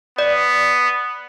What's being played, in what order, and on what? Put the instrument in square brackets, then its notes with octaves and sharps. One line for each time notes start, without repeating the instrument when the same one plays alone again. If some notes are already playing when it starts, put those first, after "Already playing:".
[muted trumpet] B3 [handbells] D5